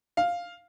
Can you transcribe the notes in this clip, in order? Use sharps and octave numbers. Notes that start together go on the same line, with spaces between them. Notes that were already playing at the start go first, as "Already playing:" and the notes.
F5